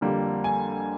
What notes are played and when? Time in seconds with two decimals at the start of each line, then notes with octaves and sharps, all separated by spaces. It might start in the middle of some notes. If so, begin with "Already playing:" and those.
0.01 F2 D3 G3 A#3
0.44 G#5